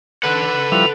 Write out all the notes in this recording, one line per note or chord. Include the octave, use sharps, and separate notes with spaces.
A4 B4 F#5
F3 G3 E4 F7